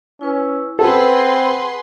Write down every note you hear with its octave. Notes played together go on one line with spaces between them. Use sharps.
C#4 E4 B4 E6
C4 G#4 A4 B4 F#5 C6